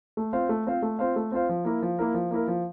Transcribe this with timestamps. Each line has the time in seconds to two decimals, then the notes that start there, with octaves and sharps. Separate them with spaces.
0.17 A3
0.33 C4 F4 C5 F5
0.49 A3
0.67 C4 F4 C5 F5
0.82 A3
0.99 C4 F4 C5 F5
1.16 A3
1.32 C4 F4 C5 F5
1.49 F3
1.65 A#3 E4 A#4
1.82 F3
1.99 A#3 E4 A#4
2.14 F3
2.31 A#3 E4 A#4
2.48 F3